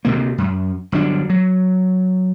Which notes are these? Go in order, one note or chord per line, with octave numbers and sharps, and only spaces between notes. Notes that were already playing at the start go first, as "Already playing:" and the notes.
D2 C3 A#3
F#2
G1 F#3 D4
F#3